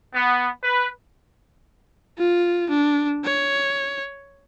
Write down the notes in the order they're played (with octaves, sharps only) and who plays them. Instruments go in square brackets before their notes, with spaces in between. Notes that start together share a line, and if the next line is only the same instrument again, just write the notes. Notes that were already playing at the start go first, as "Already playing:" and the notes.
[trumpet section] B3
B4
[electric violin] F4
D4
C#5